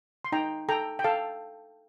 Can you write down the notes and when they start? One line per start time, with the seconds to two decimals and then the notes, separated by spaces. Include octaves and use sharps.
0.25 C6
0.32 D#4 G5 A#5
0.69 A4 G5 A#5
0.99 G5
1.04 A4 F5 A5